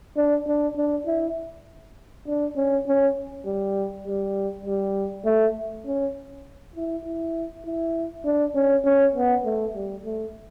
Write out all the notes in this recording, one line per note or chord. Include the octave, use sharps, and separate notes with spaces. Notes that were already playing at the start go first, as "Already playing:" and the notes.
D4
D4
D4
E4
D4
C#4
C#4
G3
G3
G3
A3
C#4
E4
E4
E4
D4
C#4
C#4
B3
A3
G3
A3